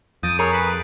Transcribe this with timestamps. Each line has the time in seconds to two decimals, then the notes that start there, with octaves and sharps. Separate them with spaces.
0.23 F2 D#6 G6 A6 D7
0.39 G#4 A#4 C#5 D#6 C7 F#7
0.53 B4 A6 D#7 E7
0.67 D#6 D7